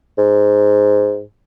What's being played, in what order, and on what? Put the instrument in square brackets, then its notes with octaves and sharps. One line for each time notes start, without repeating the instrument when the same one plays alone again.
[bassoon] G#2